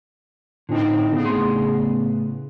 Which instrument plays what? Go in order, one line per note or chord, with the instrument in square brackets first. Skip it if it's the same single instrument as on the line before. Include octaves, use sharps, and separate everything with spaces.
[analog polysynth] A2 C4 [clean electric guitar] D3 D#4
[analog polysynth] C#3 B3
[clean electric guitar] A2 G#4 C6